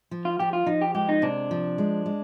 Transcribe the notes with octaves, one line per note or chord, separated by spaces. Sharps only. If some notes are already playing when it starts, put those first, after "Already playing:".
F3
F4
F3 G4
F4
F3 D#4
G4
G#3 G4
D#4
C3 D4
F3
G#3
G#3